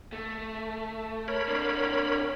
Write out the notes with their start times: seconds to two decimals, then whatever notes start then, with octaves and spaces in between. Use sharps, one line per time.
0.13 A3
1.28 A#4 C#5 B5
1.48 C4 D4